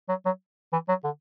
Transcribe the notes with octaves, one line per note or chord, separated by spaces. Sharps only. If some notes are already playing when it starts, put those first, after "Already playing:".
F#3
F#3
E3
F#3
D3